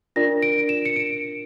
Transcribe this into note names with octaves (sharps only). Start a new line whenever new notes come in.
D4 F4 A#4 D5 A#6
D7
E7
C#7
D7